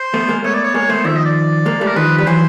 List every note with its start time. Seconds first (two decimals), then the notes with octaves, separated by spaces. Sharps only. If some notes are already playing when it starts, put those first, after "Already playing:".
Already playing: C5
0.14 A3 B3
0.29 G#3 A#3
0.44 A3 B3 C#5
0.55 D5
0.64 C#5
0.74 G#3 A#3 C#5
0.89 A3 B3 C5
1.05 D#3 F3 E5
1.16 D#5
1.25 D5
1.66 G#3 A#3
1.81 G3 A3
1.87 A#4
1.96 D#3 F3 B4
2.18 G3 B4
2.27 E3 F#3 C5